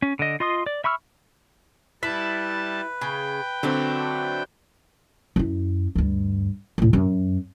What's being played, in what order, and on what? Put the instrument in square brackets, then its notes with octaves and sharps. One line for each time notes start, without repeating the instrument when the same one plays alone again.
[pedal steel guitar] C#4
D3 D#5
F4 D#5 C6 D#6
D5
E5 B5 C#6 E6 F6
[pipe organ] G3 A5 [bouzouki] E4 [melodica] B4 [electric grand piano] B6
[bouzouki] C#3 [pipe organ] G5
[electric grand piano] D3 C4 [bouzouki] F#3 A3 D4
[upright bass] F#2 E4
D2 G2
D2 A2
F#2